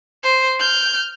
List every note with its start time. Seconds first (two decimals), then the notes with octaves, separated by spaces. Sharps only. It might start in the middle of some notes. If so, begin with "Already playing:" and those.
0.24 C5
0.60 F6 G6